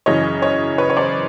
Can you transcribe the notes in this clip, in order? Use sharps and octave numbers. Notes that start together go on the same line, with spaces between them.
F#2 C#3 E3 C#5 D#5
C#5 D#5
B4 C#5
C#5
C5 D5